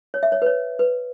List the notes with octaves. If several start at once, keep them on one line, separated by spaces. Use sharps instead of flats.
C#5
E5
C#5
B4
C#5
B4